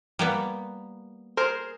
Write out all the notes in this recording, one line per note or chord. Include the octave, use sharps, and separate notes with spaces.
G3 A#3 B3
G#4 A#4 C5